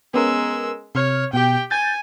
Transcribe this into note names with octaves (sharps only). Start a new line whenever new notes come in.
G#3 B3 C#4 A#4 E6
C3 C#5 F6
B2 G4 G5
G#5 G6 A6